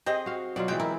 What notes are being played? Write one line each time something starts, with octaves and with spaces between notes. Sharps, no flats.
C4 G4 G#4 D#5
F#4 F5
B2 F#3 F4 D5
E3 G#3 C4 F#4 G4 G5
E4 A#4